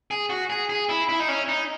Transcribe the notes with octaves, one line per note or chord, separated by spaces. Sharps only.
G#4
F#4
G#4
G#4
E4
E4
D#4
C#4
D#4